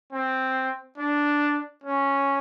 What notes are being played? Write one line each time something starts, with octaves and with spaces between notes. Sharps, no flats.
C4
D4
C#4